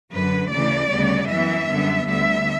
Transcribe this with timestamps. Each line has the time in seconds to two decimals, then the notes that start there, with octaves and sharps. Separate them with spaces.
0.11 F#2 D3 F#3 B4
0.50 D2 C#3 E3 A3 D5
0.90 D2 C#3 G3 B3
1.28 F#2 E3 B3 E5
1.67 F#2 D3 G3 B3
2.06 D2 D3 G3 B3 E5